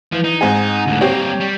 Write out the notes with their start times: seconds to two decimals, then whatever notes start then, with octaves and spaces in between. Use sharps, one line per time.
0.12 E3 F3
0.24 D#4
0.41 G#2 C4 G#4
0.87 D2 A2
1.01 G3 A#3 C4 G4 C#5
1.40 G3